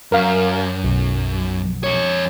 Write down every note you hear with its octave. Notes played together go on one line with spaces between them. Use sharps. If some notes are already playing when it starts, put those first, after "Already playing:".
F#2 A#4 F5
B1
F2 C#5